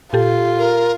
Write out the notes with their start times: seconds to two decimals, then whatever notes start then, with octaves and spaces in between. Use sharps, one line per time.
0.13 A#2 F4 G4 A4
0.59 A#4